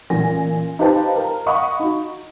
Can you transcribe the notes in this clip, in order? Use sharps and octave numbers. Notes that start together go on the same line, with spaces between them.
A1 A#2 G#5 A#6
D#4 F4 G4 B4 C5 A5
A#4
D#5 F5 F#5 B5 C#6 D#6
D#4 F#4